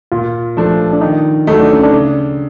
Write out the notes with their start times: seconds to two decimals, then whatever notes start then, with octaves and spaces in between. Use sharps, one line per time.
0.12 A#2 F4
0.57 F3 A3 D4
0.93 D4
1.01 D#3 D#4
1.47 F#3 A3 D#4
1.60 D4
1.72 C#4
1.84 D4
1.92 C#3